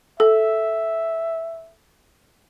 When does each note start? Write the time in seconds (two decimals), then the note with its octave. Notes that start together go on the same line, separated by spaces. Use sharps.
0.20 A4 E5